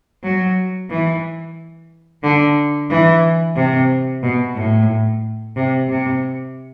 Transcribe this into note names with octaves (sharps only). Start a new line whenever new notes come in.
F#3
E3
D3
E3
C3
B2
A2
C3
C3